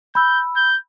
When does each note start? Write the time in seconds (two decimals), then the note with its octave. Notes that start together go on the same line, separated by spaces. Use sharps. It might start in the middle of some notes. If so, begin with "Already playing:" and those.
0.15 B5 E6 G6
0.56 G6